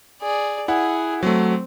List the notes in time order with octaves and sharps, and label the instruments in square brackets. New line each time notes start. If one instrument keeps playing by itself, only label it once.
[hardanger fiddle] G#4 D5
[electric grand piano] E4 F#5 [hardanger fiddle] G#4
[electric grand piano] F#3 A3 [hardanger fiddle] C4